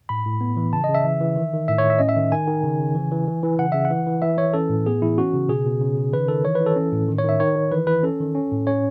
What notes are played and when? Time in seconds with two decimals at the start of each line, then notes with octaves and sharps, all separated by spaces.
0.09 A2 B5
0.25 A2
0.41 B3
0.57 E3
0.73 C#3 A5
0.84 C#3 D#5
0.95 E5
1.04 E3
1.20 E3
1.36 D#3
1.53 D#3
1.68 A2 E5
1.78 C#5
1.84 A2
1.90 E5
1.98 C#4 D#5
2.09 E5
2.16 D#3
2.32 D#3 G#5
2.48 D#3
2.64 C#3
2.80 C#3
2.95 E3
3.11 E3
3.28 E3
3.43 E3
3.59 C#3 F#5
3.72 C#3 E5
3.85 F#5
3.91 E3
4.07 E3
4.22 E3 E5
4.38 E3 C#5
4.53 C#4 A4
4.69 A2
4.86 B3 G#4
5.02 E3 E4
5.18 C#4 F#4
5.34 C#3
5.49 B2 G#4
5.66 B2
5.81 C#3
5.97 C#3
6.13 D#3 B4
6.28 D#3 A4
6.45 E3 C#5
6.55 B4
6.60 E3
6.66 A4
6.76 C#4
6.92 A2
7.08 D#3
7.19 C#5
7.24 D#3 E5
7.40 D#3 C#5
7.56 D#3
7.71 E3 B4
7.87 E3 B4
8.03 C#4 A4
8.20 D#3
8.35 C#4
8.52 A2
8.67 C#4 C#5